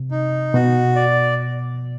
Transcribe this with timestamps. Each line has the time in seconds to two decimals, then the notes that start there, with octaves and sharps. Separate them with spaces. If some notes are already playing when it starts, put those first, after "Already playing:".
Already playing: C3
0.11 D#4
0.54 B2 F#4
0.96 D5